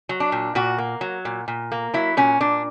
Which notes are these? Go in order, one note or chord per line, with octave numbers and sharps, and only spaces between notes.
F#3
D4
A#2
A#2 F#4
A#3
F#3
A#2
A#2
A#3
F#3 E4
A#2 C#4
A#2 D4